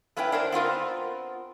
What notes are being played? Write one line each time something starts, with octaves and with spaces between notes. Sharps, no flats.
A3 B3 C#4 E4 B4 G5
D4 A#4 C5
B3 C4 F4 A#4